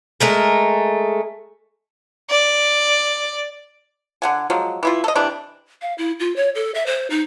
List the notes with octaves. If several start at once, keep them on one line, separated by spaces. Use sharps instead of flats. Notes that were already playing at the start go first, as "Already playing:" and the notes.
G#3 A3 A#4
D5
D3 F#5 G#5
F3 F#3 G#3
E3 E4 F4
A4 D#5
C3 E3 D4
F5
E4
F4
C#5
A4
E5
C5
D#4